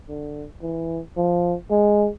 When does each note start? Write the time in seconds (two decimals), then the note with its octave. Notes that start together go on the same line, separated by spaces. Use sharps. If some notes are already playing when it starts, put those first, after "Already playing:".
0.08 D3
0.62 E3
1.17 F3
1.71 G#3